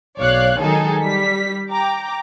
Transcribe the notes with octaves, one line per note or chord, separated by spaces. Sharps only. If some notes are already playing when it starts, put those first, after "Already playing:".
B1 C#5 D5 F5 F#6
D#3 F#3 G#3 D#4 G#4 A4
G3 B6
G5 A#5 D6